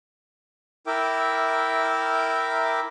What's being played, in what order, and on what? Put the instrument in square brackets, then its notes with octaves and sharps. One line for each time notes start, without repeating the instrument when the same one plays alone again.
[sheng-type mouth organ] E4 A#4 E5 G5 D6